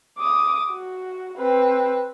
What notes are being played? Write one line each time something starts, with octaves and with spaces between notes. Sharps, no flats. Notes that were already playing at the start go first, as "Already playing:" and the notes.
D6 D#6
F#4
C4 B4